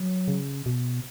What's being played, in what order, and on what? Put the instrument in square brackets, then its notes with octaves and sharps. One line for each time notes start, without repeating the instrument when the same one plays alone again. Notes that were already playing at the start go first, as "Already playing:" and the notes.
Already playing: [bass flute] F#3
[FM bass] C#3
B2